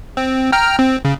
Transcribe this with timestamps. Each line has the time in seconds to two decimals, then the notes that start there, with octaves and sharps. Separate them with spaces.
0.17 C4
0.52 G5 A#5 F6
0.79 C4
1.05 C#3